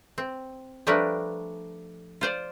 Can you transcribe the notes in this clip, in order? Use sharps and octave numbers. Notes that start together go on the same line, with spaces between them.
C4
F3 G3 A3 D4 A#4 B4
F4 C5 D5